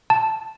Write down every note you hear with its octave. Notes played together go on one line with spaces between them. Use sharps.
A5